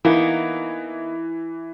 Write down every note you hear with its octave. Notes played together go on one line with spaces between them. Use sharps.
E3 A#3 B3 D#4